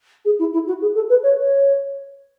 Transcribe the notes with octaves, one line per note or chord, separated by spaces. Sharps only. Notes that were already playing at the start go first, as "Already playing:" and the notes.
G#4
E4
E4
F#4
G#4
A4
B4
C#5
C#5